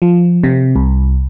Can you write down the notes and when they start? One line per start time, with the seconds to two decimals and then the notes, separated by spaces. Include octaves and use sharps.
0.02 F3
0.43 C3
0.76 C2